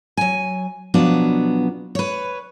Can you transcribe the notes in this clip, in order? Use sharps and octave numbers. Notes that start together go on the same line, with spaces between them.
F#3 G#5
B2 F3 F#3 B3 D4 F#4
B4 C#5